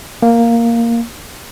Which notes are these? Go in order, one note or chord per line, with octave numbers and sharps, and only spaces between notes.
A#3